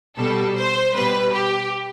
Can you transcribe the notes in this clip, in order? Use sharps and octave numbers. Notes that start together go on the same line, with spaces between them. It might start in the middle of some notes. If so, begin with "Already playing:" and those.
B2 G3 A4
C5
B2 G3 B4
G4